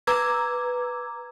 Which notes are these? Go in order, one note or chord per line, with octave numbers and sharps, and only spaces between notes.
B4 A#5 D6 E6 G#6